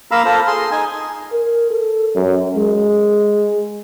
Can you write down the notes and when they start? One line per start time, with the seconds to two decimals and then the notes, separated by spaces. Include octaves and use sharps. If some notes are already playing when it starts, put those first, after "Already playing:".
0.11 A#3 F5 A#5 B5 E6
0.25 F4 A4 C5
0.47 G#4 C6
0.72 D#4 G#5
1.32 A#4
1.71 A4
2.16 F#2
2.56 G#3